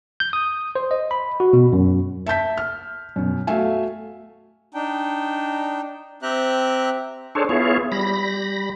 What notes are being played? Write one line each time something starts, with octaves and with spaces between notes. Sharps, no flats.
G6
D#6
C5
D#5
B5
F#4
B2
F#2
E5 A5 G6 B6
F6
F#2 B2
A3 F#4 E5 F5 G#5
D4 D#4 G5
C4 G4 E5 G5 A#5 F#6
D4 G#4 A4 C5 C#5
B3 E4 F4 G#4 C#5
G3 B5 A#6